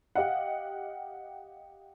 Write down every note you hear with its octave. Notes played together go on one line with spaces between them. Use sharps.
G4 D#5 F5 F#5